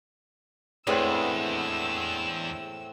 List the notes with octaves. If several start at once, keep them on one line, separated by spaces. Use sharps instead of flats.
E2 A2 G#3 C4 D4 B4 F#5 E6